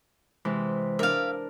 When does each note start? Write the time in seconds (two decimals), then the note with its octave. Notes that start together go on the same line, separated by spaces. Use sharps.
0.45 C3 E3 G#3
0.99 D4 A#4 E5 F5